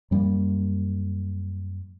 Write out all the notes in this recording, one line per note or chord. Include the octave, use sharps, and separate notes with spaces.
F#2 G3 A3 A#3